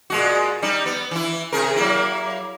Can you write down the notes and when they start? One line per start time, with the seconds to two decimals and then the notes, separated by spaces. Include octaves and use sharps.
0.10 A#2 G#3 F#4
0.62 G3 D#4
0.86 B3
1.11 E3 E4
1.52 C3 G#4 A#4
1.76 F#3 A#3 E4